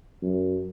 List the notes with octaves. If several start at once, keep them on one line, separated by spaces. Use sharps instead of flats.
F#2